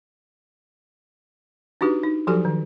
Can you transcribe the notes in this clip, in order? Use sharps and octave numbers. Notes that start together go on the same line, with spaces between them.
D4 D#4 F#4 G4 B4
D#4
F3 F#3 F#4 G4 A4 G#5
D#3